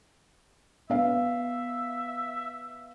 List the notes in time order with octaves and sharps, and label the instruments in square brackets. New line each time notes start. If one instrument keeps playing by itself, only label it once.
[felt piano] B3 F5 [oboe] E5